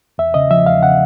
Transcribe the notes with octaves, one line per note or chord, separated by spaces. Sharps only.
E2 E5
C#3 D#5
F3 E5
E2 F5
C#3 F#5